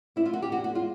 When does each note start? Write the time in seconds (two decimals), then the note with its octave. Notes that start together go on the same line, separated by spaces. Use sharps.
0.16 A#3 E4
0.26 F4
0.33 A#3 F#4
0.42 G4
0.52 E2 F#4
0.64 F#4
0.70 G#3
0.75 F4